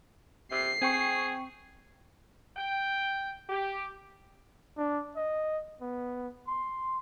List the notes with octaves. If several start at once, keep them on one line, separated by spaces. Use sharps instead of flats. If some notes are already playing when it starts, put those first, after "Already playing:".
C3 C7
C4 G#4 G5 C#6
G5
G4
D4
D#5
B3
C6